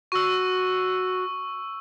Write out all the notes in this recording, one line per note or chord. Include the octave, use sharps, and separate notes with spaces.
F#4 C#6 E6